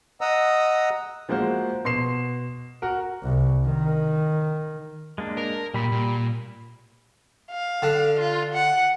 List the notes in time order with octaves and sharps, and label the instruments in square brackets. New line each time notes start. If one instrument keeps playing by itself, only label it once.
[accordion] D#5 F#5 A#5 D#6 E6
[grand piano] F3 G#3 A#3 F#4 C5
B2 C6 C7 E7
F#4 A#4
[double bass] C2
D#3
[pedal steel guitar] G#3 A#3 D4
[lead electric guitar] A#4
[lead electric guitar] A#2 [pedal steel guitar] G3 B5
[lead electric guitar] A#2
[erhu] F5
[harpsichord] D3
[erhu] F4
F#5